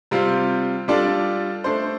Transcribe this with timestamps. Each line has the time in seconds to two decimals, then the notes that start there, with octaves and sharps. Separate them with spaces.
0.11 C3 G3 C4 F4
0.88 G3 D4 F4 A4 D5
1.64 A3 D4 A4 C5